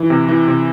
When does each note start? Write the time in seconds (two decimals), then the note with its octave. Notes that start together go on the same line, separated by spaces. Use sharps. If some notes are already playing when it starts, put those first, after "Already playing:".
Already playing: E3
0.10 C3
0.29 E3
0.48 C3